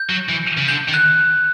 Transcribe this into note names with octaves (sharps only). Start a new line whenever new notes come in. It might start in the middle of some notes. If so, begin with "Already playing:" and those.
Already playing: G6
F#3
E3
C#3
D3 G6
D#3
F#6